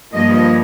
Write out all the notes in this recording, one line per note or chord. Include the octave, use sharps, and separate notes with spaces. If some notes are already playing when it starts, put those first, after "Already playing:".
G2 F3 A#3 D#5